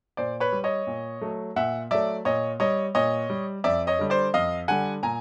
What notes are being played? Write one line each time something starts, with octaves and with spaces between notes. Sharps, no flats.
A#2 C5 D5
B4 C#5
G3
C#5 D#5
A#2
F#3 A3
A#2 E5 F#5
F#3 A3 D5 E5
A#2 C#5 D#5
G3 C#5 D#5
A#2 C#5 D#5
G3
F2 D5 E5
C#5 D#5
D3 G3
C5 D5
F2 D#5 F5
D3 G3 F#5 G#5
A#2 G#5 A#5